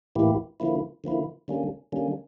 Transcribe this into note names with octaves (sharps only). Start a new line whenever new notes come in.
A2 E3 A#3 E4 G4
D3 F3 A#3 E4
D3 F3 A#3 E4
D3 G3 A#3 C#4
D3 G3 A#3 C#4